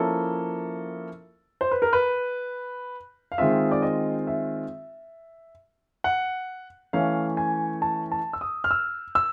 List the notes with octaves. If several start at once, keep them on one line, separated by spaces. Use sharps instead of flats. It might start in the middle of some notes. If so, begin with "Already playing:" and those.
Already playing: F3 A#3 C#4 E4 A4
C5
B4
A#4
B4
F5
D#3 G#3 C4 F4 E5
D5
D#5
E5
F#5
E3 A3 C#4 F5
G#5
A5
A5
E6
D#6
F6
E6
E6